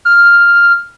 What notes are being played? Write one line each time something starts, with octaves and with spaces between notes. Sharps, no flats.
F6